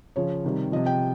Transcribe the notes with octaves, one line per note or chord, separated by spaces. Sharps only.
C#3 F3 C#5
C3 D#3 G3
C3 F3 D#5
G5